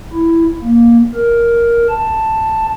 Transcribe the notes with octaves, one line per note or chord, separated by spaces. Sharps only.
E4
A#3
A#4
A5